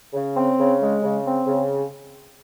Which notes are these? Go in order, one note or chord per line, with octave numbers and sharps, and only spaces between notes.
C#3
C4
C#3
G#3
C#3
C4
C#3